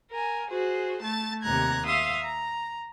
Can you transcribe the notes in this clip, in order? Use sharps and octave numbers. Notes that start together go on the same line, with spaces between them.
A#4 G#5
F#4 G#4 C5
A3 A5 A6
D#2 C3 A#5 F#6 G#6
E5 F5 C6 D#6
A#5